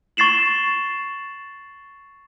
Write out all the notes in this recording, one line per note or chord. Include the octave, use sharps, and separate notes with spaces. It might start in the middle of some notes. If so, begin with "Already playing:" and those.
C#6 A6 C7 E7 F#7